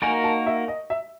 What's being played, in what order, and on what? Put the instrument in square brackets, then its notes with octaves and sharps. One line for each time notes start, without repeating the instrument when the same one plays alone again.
[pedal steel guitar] A#3 D#4 F#4 A#4 [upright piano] G#5
[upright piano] A5
E5
D#5
E5